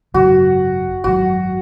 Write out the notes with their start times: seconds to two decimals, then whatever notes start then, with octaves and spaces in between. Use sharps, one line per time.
0.14 G#1 F#2 C#3 F#3 F#4
1.04 G#1 F#2 C#3 F#4
1.09 F#3